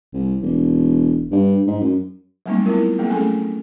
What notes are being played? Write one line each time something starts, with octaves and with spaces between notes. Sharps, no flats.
C2
E1
G2
G#2
F#2
F#3 G3 A3 A#3 C4 D#4
B3 C4 E4 F4 A#4
F#3 G#3 A#3 C4 G#4
A3 C#4 G#4 A4 G#5